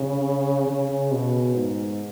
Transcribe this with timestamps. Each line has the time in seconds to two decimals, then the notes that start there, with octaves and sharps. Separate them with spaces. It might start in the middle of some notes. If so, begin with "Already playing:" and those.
Already playing: C#3
0.66 C#3
1.11 B2
1.55 G#2